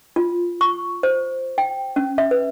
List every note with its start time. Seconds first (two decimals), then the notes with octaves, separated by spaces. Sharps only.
0.16 F4
0.61 C#6
1.03 C5
1.58 G5
1.96 C#4
2.18 E5
2.31 B4